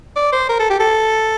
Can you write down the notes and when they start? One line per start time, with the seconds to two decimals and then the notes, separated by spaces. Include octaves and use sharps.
0.16 D5
0.33 C5
0.49 A#4
0.59 A4
0.70 G4
0.80 A4